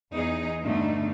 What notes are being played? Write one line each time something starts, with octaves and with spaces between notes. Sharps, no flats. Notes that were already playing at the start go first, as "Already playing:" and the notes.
E2 D#4 G#4
G2 B2 D3 A3 D#4